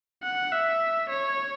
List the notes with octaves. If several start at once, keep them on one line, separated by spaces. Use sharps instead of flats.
F#5
E5
C#5